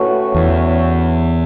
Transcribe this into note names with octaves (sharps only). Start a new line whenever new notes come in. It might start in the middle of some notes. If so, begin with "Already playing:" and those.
Already playing: A2 A3 C#4 F#4 B4
E2